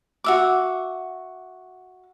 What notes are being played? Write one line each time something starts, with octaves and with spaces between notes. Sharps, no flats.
F#4 E5 D6